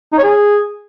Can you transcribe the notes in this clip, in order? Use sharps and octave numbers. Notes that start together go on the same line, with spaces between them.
D#4
C#5
G#4